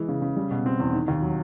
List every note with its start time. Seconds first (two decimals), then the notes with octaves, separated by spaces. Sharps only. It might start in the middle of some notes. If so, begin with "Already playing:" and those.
Already playing: E3 G#3
0.09 C#3
0.22 C#3
0.36 G3
0.51 B2
0.66 C4
0.80 E2
0.93 D#3
1.08 D#2
1.22 F#3